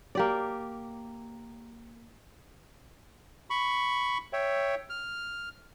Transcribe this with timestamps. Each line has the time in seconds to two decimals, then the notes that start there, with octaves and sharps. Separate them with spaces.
0.15 A#3 G4 D5
3.50 B5 C#6
4.33 C#5 E5 G5
4.90 F6